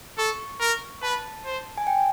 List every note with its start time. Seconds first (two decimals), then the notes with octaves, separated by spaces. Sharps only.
0.18 A4 C#6
0.60 A#4
1.02 B4 A5
1.45 C5
1.78 G#5
1.87 G5